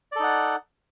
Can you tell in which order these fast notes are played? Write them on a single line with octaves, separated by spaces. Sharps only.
D5 A4 D#4 F#5